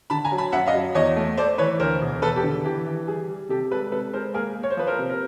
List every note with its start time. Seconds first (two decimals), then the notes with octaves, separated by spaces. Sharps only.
0.10 D3 A5 B5
0.24 G#5 A#5
0.32 F#3
0.38 A5 B5
0.52 F#2 E5 F#5
0.66 D#5 F5
0.74 F#3
0.95 E2 C#5 D#5
1.16 A3
1.37 A3 C5 D5
1.58 E3 B4 C#5
1.80 D2 A#4 C5
2.02 E1
2.22 E1 A4 B4
2.36 G4 A4
2.44 D3
2.64 E3 G4
2.86 E3
3.07 G3 G#4
3.28 G3
3.49 C3 G4 A4
3.71 G#3 A4 B4
3.92 C3 A4 B4
4.13 G#3 A#4 C5
4.34 A#3 G#4 A#4
4.55 A#3
4.63 C#5
4.70 C5
4.77 F3 B4
4.87 A#4 C5
4.99 C3
5.09 A#4